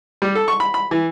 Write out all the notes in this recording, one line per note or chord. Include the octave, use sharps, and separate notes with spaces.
G3
A4
C#6
B5
B5
E3